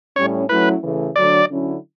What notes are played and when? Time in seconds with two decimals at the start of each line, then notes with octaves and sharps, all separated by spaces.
0.16 A2 G3 C#4 C#5
0.49 F#3 A3 C#4 E4 B4
0.83 C#3 E3 A3
1.16 D3 F#3 A3 D4 D5
1.48 D3 F#3 C#4 E4